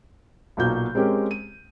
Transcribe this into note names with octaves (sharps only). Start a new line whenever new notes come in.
B1 A#2 F#4 G6
G#3 C4 C#4 G4 A#4
D#7